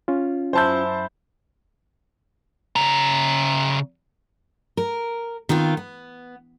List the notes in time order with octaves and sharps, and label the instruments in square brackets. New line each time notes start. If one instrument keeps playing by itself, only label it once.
[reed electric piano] C#4 F4
[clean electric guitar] F#2 E4 [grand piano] C5 A5 G6
[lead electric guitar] C#3 A#5
[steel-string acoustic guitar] A#4
D#3 B3 C4 F4
B3